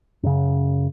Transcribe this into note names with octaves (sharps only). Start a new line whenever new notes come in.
F#2 C#3